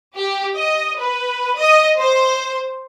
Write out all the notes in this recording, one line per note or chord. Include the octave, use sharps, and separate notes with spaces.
G4
D#5
B4
D#5
C5